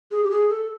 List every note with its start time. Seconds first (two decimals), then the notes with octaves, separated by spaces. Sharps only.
0.11 G#4
0.24 G4
0.31 G#4
0.50 A4